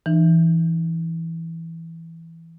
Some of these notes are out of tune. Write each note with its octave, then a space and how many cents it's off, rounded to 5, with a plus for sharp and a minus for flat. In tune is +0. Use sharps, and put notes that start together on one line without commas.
E3 +0 D#4 -40